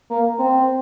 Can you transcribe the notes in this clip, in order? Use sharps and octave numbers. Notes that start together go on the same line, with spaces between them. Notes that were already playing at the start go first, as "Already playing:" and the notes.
A#3
C4